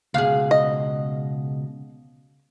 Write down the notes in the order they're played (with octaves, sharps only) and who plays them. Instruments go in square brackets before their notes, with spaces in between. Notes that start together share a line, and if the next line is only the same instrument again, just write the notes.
[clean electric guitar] C#2 B2 [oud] G#4 F5
[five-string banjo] D#5